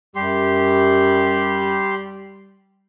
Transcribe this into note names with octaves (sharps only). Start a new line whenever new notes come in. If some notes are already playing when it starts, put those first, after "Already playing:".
F#2 G3 G4 C6